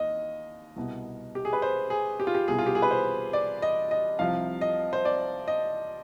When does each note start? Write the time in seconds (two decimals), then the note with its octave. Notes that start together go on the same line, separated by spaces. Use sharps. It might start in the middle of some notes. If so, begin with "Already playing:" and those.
Already playing: D#2 D#5
0.76 C2 B2
1.35 G4
1.45 G#4
1.53 B4
1.62 C5
1.90 G#4
2.20 G4
2.27 F4
2.35 G4
2.48 C2 B2 G#4
2.58 F4
2.66 G4
2.75 G#4
2.82 B4
2.91 C5
3.33 D5
3.62 D#5
3.91 D#5
4.19 C2 C3 F3 F5
4.61 D#5
4.93 C5
5.05 D5
5.48 D#5